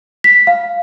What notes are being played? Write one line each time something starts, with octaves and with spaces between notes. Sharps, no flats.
B6
F5